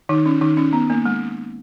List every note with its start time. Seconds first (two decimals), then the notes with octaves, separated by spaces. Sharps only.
0.09 D#3 D#4
0.26 C#4
0.41 D#3 D#4
0.57 C#4
0.73 B3
0.90 A#3
1.06 G#3